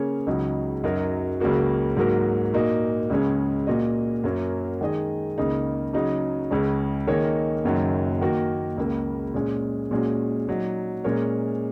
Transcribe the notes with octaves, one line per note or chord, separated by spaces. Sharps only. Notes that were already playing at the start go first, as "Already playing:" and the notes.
Already playing: C#3 A#3 C#4 G#4 C#5
C#2 C#3 F#3 D#4
F#2 F#3 D#4 F#4 A#4
C#2 C#3 F#3 A#3 F#4
G#2 F#3 A#3 F#4 A#4
A#2 A#3 D#4 F#4
C#2 C#3 G#3 C#4
A#2 A#3 F#4 D#5
F#2 F#3 A#3 C#4
D#3 G#3 D#4 G#4 D#5
C#2 C#3 A#3 D#4
C#3 F#3 D#4 G#4
C#2 C#3 G#3 C#4
D#3 A#3 D#4 G#4 C#5
F#1 F#2 D#3 F#3
D#3 A#3 F#4 A#4
C#2 C#3 A#3
A#2 G#3 C#4
A#2 G#3 C#4 F#4
A#2 F#3 D#4
A#2 G#3 C#4 A#4 C#5